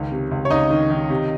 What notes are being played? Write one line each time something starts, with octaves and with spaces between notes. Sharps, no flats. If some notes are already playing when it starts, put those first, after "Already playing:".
Already playing: C#2 D#3 C#4
C3
C#2
C#5
C#2 D#4 D#5
D#3
D#3
C3